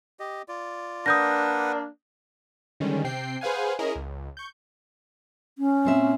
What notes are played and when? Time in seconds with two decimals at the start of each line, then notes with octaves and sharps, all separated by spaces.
0.20 G4 D#5
0.48 F4 D5
1.06 A#3 D4 B4 F#5 D#6 G6 A#6
2.80 D3 D#3 G3 G#3 C#4
3.04 C3 C4 G5 C7
3.41 G#4 B4 C5 F5 F#5 G#5
3.79 C#4 E4 G#4 A#4 D#5
3.96 C#2
4.37 C#6 G6
5.58 C#4
5.85 A#2 C4 E5